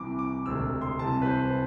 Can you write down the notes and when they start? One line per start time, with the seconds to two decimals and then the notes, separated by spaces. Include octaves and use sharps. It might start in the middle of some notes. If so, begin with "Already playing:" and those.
Already playing: C2 C3 E3 D6
0.19 D6
0.46 E1 D2 C3 E6
0.81 C6
0.99 C2 C3 E3 A5
1.22 B4
1.26 C5